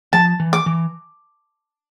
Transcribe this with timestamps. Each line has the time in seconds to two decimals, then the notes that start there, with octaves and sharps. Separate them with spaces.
0.13 F3 A5
0.40 E3
0.53 D6
0.66 E3